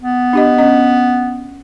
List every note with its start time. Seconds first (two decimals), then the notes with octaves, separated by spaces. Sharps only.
0.01 B3
0.33 D4 G4 D#5
0.58 C#4 D#5